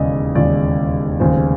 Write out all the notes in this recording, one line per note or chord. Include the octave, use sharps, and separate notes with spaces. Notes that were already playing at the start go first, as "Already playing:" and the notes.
Already playing: E1 D#2 C#3 D5 D#5
E1 D#2 C#3 D5
F1 D#2 C#3 C5